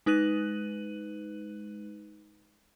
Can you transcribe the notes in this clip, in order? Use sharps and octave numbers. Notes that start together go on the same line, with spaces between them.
G#3 D#4 B4 F#6 D#7 F#7